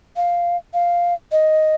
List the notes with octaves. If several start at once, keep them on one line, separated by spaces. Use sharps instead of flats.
F5
F5
D#5